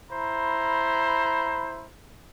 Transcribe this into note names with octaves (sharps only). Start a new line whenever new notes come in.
E4 C5 A#5 B5